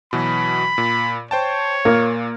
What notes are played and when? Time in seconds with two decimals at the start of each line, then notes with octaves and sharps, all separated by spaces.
0.13 B2 E3 F#3 B5
0.78 A#2
1.31 C5 C#5 G5 A5
1.85 A#2 A#3